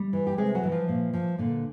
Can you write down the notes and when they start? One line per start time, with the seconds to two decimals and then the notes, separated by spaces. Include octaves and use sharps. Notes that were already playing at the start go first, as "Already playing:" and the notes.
Already playing: G3
0.13 E3
0.27 G4
0.38 C3 G#3 G#4
0.55 F#3 F#4
0.63 E3
0.72 F3 F4
0.88 A#2
1.13 F3
1.38 A#2 D3 D4